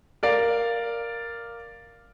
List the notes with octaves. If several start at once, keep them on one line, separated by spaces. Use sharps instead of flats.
A#4 D5 F5